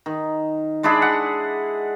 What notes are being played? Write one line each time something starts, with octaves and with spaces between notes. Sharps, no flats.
D#3
G#3 D4 E4 G#4
F#5